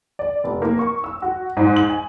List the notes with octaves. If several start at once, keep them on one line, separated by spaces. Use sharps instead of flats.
D5
F1
A#3
C#6
E6
F#4
G#2
F#7
G#5